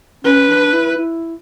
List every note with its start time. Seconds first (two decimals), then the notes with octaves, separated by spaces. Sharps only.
0.24 C#4 B4
0.49 D4
0.73 E4
0.97 E4